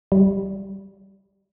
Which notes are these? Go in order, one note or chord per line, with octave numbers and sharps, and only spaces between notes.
G3